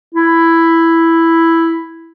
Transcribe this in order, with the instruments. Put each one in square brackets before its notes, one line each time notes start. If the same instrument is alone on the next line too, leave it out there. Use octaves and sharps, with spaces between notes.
[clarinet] E4